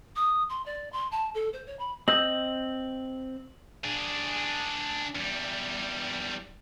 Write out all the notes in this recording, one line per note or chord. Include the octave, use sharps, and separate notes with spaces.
D#6
C6
D5
C6
A5
A4
C5
C#5
B5
C4 D#5 E6 G6 F#7
D4 G#4
E2 G3